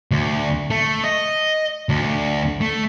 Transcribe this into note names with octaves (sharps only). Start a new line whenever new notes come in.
D2
A3
D#5
D2
A3